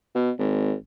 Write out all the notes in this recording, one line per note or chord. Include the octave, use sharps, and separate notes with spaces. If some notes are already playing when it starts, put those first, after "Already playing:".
B2
G#1